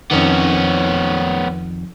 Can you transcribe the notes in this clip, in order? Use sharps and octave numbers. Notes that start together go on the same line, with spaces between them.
F2 D#3 B3 C#4